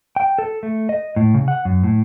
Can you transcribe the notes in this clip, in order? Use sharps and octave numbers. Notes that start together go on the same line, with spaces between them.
G5
A4
A3
D#5
A2
C#3
F#5
F#2
A2